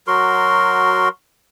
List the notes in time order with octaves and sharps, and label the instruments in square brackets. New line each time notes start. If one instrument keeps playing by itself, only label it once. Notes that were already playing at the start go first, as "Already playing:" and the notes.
[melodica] F#3 F#4 A#4 C6